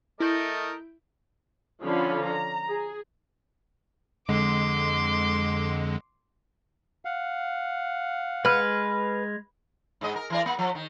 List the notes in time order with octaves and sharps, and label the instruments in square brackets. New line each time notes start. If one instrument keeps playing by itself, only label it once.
[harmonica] A3 A#4 D#5 [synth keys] E4 G6 D7
[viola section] D3 F3 C#4 D5 F5 B5
A#5
G#4
[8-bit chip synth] F2 D3 G#3 [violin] C6 D6
[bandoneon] F5 F#5
[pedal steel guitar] G#3 F6 [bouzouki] B4
[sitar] G#2 G#3 D#5
A#4
E3 A#4 D5
A#3
F3
D#3